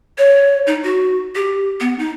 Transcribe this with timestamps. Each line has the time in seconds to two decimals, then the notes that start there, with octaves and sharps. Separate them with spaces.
0.18 C#5
0.67 D#4
0.83 F#4
1.35 G4
1.80 B3
1.99 D#4